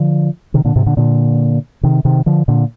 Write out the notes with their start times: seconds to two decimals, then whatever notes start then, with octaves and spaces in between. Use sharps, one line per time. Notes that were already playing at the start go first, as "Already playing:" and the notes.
Already playing: D3 F3
0.54 C3 D#3
0.65 A#2 D3
0.76 G#2 C3
0.86 A#2 D3
0.97 A#2 D3
1.83 C3 D#3
2.05 C3 D#3
2.26 D3 F3
2.48 A#2 D3